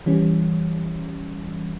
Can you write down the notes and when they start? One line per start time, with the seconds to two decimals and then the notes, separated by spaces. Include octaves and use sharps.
0.06 E3 G3 C#4